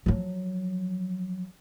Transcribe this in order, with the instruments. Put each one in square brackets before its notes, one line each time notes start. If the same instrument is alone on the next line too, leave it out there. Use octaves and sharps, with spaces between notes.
[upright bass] F3 F#3